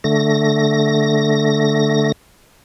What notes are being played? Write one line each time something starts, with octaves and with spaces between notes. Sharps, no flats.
D3 A3 A#6